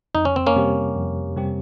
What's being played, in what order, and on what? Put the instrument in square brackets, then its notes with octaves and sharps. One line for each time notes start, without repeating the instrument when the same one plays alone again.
[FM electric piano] F2 [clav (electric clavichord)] D#4
[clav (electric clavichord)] C#4
C4
A#3 C#4
[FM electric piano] C3 G3 C4 G4
F2
C3 G3 C4 G4